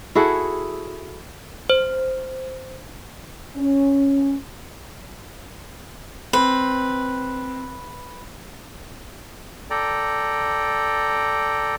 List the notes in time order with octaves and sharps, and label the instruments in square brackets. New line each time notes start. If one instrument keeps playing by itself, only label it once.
[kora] E4 F#4 G#4 A4
[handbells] C5
[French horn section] C#4
[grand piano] C4 [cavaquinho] B4
[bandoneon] A4 D5 G5 A#5